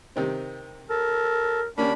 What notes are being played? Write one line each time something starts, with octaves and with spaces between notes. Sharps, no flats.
C3 D#3 C4
A4 A#4
A#3 C#4 D4 G4 B5